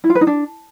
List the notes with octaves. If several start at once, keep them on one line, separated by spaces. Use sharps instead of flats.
E4
F4
B4
D#4
D4